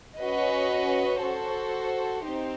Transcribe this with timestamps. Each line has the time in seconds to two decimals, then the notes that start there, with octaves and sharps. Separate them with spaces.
0.20 C#4 F#4 B4 D#5
1.22 F#4 A4 C5
2.25 C4 D#4 G4 C5